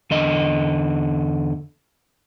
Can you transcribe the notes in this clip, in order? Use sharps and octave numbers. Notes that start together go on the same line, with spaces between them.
E2 D3 D#5